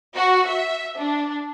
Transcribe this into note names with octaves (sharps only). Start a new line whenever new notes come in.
F#4
E5
D4